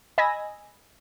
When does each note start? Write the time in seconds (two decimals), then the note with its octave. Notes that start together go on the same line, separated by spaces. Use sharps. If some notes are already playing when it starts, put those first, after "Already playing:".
0.18 D#5 G#5 B5 E6 G#6 A#6